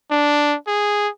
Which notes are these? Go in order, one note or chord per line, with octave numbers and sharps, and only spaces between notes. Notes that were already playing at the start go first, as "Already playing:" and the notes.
D4
G#4